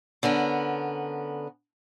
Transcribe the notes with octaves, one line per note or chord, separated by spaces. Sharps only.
D3 B3 C#4 A#4